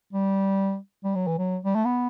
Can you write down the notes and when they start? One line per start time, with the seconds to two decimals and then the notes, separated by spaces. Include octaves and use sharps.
0.13 G3
1.04 G3
1.15 F#3
1.27 E3
1.38 F#3
1.65 G3
1.75 A3
1.85 B3